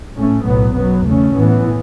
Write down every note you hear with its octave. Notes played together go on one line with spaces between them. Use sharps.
A2 A3 C#4
B1 A2 F#3 B3
F#2 F#3 B3
E2 C#3 A3 C#4
A2 E3 B3